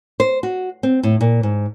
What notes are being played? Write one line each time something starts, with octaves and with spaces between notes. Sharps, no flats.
C5
F#4
C4
A2
A#2
G#2